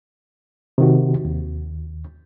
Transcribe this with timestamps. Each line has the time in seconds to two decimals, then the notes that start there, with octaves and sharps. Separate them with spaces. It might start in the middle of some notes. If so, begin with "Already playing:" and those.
0.78 C3 D#3 F#4
1.25 D#2